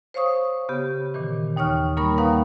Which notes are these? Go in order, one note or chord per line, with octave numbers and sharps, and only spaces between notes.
C5 C#5 F5 C#6 D#6
C#3 B3 G4
A#2 D#3 E3
D#2 D#4 C#5 C#6 F6
G3 A#3 D#4 A#4 B5 C#6
D#2 D#4 B4 F5 F#5 A#5